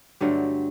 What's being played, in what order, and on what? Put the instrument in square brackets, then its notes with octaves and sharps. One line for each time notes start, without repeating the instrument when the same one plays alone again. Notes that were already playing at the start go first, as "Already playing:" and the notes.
[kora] G2 D3 F#3 A3 G4